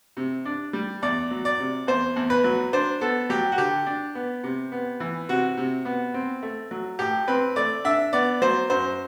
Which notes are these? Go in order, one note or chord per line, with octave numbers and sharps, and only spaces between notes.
C3
D4
G3
E2 D5
F#3
D5
C3
E2 C5
E2
B4
F#3
D4 C5
B3 A4
F#3 G4
F#4
D3 G4
D4
B3
C3
B3
E3
C3 F#4
C3
B3
C4
A3
F#3
A2 G4
C4 B4
A3 D5
D4 E5
B3 D5
F#3 C5
F#2 C5